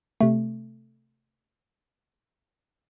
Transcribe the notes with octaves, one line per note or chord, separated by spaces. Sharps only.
C3 A3